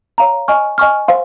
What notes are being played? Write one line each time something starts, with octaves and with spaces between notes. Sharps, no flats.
C#5 F5 A#5
D#5 G#5 C#6 F6
D#5 G#5 C#6 F6
C5 F5 C6